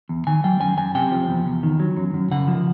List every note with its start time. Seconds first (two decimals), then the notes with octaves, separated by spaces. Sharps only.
0.09 E2
0.27 D#3 G#5
0.44 F#3 G5
0.60 F#2 G#5
0.78 F#2 G#5
0.95 C3 G5
1.12 F3
1.29 E2
1.46 E2
1.63 D#3
1.80 F#3
1.97 F#2
2.14 F#2
2.31 C#3 F#5
2.48 F3